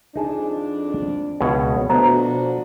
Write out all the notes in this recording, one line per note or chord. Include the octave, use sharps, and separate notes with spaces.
F2 D4 D#4 G#4 A5
C#2 B2 C#5
B2 F3 A3 D4 F#4 C5 A5 A#5